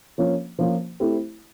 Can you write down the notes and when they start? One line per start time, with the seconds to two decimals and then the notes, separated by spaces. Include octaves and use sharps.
0.18 F3 A#3 C#4 F4
0.59 F3 A#3 C#4 F4
1.00 A3 C4 E4 G4